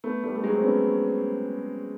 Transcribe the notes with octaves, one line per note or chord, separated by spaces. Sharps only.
A3 B3
G3 A3
A3
F#3 G#3
C4
B3 C#4